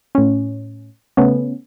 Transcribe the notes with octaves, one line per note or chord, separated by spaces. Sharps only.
A2 C#4
C#3 A3 B3 C#4